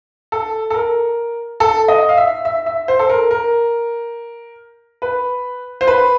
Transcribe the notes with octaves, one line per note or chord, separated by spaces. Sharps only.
A4
A4
A#4
A4
D#5
F5
E5
E5
E5
C5
A4
A#4
A#4
B4
C5
B4